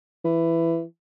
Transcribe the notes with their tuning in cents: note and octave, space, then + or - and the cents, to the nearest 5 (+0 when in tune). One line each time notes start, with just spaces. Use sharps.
E3 +10